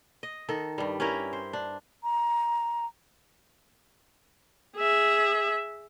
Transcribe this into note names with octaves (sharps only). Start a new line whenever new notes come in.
D#5
D#3 A4
G2 G3
C#4 E4 G4 A#4
C5
D4
A#5
G#4 E5